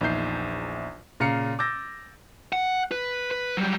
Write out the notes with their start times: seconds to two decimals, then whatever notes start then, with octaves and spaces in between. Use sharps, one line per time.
0.01 A#1 E2 D#4 E5 G6 C7
1.20 A#2 C#3 F5 A#5 C#7
1.59 D6 E6 G6 A6 A#6
2.53 F#5
2.92 B4
3.31 B4
3.57 F#3 G3